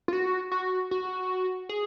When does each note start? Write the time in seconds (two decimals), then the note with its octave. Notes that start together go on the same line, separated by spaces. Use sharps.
0.08 F4
0.13 F#4
0.52 F#4
0.91 F#4
1.69 G#4